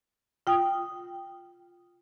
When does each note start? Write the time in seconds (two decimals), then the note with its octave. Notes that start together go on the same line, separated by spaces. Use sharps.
0.47 F4 G5 D#6